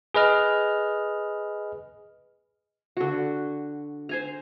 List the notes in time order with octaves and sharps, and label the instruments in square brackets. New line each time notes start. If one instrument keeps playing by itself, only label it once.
[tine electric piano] G#4 B4 D#5 F6
[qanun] D3 F#4
C5 G#5 A#5